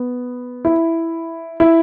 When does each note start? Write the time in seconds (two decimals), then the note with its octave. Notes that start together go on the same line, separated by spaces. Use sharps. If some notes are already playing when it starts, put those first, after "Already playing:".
Already playing: B3
0.65 E4
1.60 E4